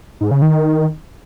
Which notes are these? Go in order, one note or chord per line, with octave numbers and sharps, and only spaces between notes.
G#2
C#3
D#3